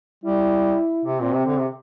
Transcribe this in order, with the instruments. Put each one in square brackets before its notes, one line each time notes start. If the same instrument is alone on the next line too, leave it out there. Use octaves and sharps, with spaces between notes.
[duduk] G3 [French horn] E4
[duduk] C3
[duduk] A#2 [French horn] C4
[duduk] C3
D3
C3